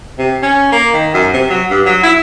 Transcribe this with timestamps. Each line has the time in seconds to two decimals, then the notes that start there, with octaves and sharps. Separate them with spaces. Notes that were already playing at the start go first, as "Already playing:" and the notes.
0.18 C3
0.42 C#4
0.72 A#3
0.94 D#3
1.14 F#2
1.33 C3
1.50 F#3
1.70 G2
1.85 F#3
2.03 E4